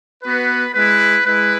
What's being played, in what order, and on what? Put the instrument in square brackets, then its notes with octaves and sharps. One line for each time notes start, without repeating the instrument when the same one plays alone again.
[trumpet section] B3 F#4 B4
G#3 E4 B4
G#3 E4 B4